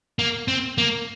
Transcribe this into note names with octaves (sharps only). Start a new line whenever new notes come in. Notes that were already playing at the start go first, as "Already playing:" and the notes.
A#3
C4
A#3